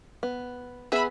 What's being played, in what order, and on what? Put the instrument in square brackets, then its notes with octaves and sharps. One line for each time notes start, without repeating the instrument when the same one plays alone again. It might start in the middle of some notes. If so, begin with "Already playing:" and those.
[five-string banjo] B3
[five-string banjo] B3 G#4 [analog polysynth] E5 B5